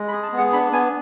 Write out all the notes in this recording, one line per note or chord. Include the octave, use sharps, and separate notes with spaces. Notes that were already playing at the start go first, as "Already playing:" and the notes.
Already playing: G#3
B5
G#4
A5
B3
F#5
D4 B5
B3 G#5